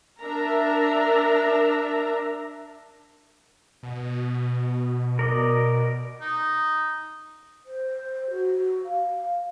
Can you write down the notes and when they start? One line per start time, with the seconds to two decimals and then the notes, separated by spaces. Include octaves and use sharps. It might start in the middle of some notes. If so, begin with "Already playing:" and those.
0.21 D4 A#4 E5 A#5
3.83 B2
5.19 A#4 D5 D#5
6.21 D#4
7.65 C5
8.30 F#4
8.84 F5